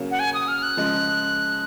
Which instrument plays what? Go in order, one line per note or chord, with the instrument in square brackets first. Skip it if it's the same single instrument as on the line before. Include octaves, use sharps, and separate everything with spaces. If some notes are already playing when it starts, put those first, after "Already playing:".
Already playing: [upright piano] C#3 F#3 A#3 C#4
[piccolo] F#5
G#5
D#6
F6
F#6
[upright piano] C#3 F3 G#3